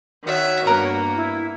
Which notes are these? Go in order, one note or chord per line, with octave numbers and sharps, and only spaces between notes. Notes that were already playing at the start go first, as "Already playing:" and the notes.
D#3 F#4 C#5 E5
G2 A#3 B3 A#4
E4